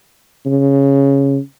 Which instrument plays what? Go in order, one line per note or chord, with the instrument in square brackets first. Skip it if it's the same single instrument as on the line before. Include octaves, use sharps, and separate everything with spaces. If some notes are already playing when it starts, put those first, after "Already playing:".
[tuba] C#3